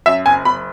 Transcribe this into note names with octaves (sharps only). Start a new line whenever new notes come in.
F#2 E5
F#1 G#5
F#1 B5